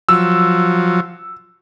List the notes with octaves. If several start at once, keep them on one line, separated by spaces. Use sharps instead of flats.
F3 F#3 E6